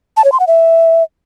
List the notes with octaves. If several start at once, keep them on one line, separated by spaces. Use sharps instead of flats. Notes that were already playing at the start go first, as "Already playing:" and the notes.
A5
C#5
C6
F#5
E5